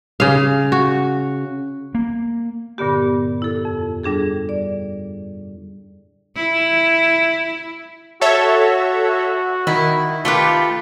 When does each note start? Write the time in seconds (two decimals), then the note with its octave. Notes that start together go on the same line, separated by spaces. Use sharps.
0.20 C#3 F5
0.72 F#4
1.95 A#3
2.78 G2 A#2 D3 B3 G4
3.42 E4 A4
3.65 F2
4.03 G3 D4 G#4 A4
4.49 D5
6.36 E4
8.21 F#4 A4 C#5 E5
9.67 D#3 E4
10.25 A3 F4 G4 B4